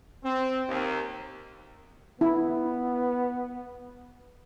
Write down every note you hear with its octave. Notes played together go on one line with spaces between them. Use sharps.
C4
D#2
B3 E4